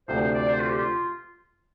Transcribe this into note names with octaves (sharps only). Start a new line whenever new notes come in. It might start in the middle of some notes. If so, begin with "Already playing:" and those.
D2 C3 F3 C5
C5
D5
C5
F4
G4
F4